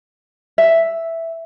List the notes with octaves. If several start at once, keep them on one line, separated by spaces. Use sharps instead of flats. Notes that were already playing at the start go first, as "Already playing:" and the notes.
E5